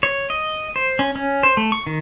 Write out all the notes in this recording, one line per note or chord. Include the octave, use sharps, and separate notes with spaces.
C#5
D#5
C5
C#4
C#4
C5
A3
C#6
D#3